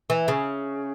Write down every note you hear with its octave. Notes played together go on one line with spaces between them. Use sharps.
E3
C#3